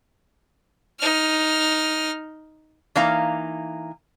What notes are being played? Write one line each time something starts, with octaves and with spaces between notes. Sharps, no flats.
D#4 F6
E3 A#3 D#4 F5 A#5